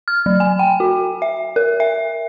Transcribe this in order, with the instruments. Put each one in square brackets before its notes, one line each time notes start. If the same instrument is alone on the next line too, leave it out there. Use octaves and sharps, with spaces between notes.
[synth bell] F6
F#3
G#5
G5
F#4
E5
A#4
E5